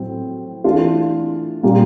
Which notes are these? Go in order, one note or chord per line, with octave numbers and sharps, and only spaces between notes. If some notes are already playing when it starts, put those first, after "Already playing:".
Already playing: A2 F#3 A3 C4
E3 A3 D4 F4
A#2 G3 A#3 C#4 F4